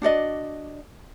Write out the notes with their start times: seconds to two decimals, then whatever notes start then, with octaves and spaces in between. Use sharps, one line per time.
0.02 D4 F#4 D5 D#5